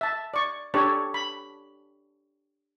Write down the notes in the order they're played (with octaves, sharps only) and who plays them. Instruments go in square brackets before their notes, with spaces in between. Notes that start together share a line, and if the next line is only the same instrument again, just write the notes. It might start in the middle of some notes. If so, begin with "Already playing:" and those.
[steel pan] E5 A5
D5 C#6
D4 G4 A4 C#5
B5